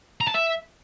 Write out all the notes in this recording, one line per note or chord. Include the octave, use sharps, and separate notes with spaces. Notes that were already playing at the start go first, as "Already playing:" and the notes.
A#5
A5
E5